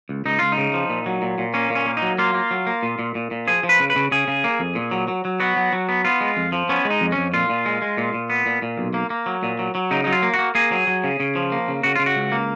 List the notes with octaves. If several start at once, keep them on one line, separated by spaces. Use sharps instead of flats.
C#2
C#2 D#4
C#2 F4
D#4
C#3
F3
A#2
F#3
A#2
A#2
A#3 C#4
A#2
C#4
A#3
D#4
F#3
A#3 F4
A#3
F#3
A#3
A#2
A#2
A#2
A#2
F3 G#4
F3
B4
C#3
B4
C#3
C#3 G#4
C#3
A#3
F2
A#2
F#3
F#3
F#3
B3 F#4
F#3
F#3
B3
B3 F4
G#3
F2
F3
B3 C#4
G#3
D#4
F2
C#4
F2
A#2 F4
A#2
G#3
G#3
A#2
A#2
B3
A#2
A#2
B1
A#3
A#3
F#3
A#2
F#3
F#3
C#3 D#4
F#3 D#4
F4
A#3
F#4
A#3
A#3 G#4
F#3
F#3
C#3
C#3
F3
A#3
C#3
C#3 F#4
C#3 F4
F#4
C#2
A#3